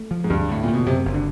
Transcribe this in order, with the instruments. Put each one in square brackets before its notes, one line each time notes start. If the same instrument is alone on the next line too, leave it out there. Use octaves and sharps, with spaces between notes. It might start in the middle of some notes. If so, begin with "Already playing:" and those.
Already playing: [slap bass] A3
F3
[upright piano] G#2
[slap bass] D2 [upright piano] G2
[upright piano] A2 [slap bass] D3
[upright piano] A#2 [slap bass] A3
[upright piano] B2
[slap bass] F#2 [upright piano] C3
[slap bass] F#1
[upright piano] D3